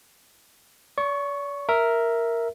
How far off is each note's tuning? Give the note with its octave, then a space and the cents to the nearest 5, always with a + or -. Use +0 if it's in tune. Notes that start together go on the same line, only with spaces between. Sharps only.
D5 -45 C#6 +0
A#4 +0 E5 +0